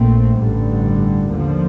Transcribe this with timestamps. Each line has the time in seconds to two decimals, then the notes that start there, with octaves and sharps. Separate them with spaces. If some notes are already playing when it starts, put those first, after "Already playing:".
Already playing: A#1 A#2 A3 C4
0.37 A1 G2 D3 G3
1.31 D#2 D3 F3